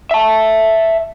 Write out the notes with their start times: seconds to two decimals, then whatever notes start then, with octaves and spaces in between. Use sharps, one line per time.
0.11 E5 A5